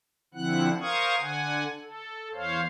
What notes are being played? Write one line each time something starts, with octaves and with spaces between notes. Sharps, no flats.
D3 F3 C4 E4 F#5 F#6
A#4 C5 F5 C#6 D#6 G#6
D3 F#5 G#5
A4
E2 C5 C#5 F5